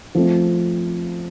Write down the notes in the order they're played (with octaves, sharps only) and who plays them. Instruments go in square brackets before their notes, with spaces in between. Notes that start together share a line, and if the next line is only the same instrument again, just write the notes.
[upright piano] F3 A3 C4